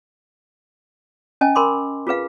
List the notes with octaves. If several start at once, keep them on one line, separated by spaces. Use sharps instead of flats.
C#4 D#5 G#5 A5
A#4 G#5 B5 C6 D6
F4 G#4 B4 F5